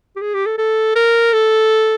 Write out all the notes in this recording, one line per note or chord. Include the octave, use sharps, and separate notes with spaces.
G4
G#4
G4
A4
A4
A#4
A4